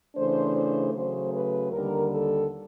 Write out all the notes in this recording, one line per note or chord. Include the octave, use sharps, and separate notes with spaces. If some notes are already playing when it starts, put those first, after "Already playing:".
C#3 E3 A3 D4 C5
C5
C#3 F#3 A3 C5
B4
D#2 D3 G3 A#4
A4